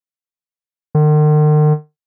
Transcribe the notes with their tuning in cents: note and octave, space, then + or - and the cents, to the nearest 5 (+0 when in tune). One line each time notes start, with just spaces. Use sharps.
D#3 -45